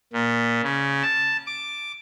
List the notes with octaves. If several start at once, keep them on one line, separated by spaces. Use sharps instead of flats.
A#2
C#3
A5
D6